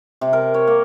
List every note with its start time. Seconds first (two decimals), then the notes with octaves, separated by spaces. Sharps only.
0.21 C3
0.33 A#4
0.54 C#5
0.67 A#3